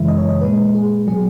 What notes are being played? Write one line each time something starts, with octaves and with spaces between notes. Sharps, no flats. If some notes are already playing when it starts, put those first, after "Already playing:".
Already playing: F#2 C#3 E3 G#3 E5
D#5
C#5
D#5
A#2 G#3 B4
G#4
B2 F#3 G#4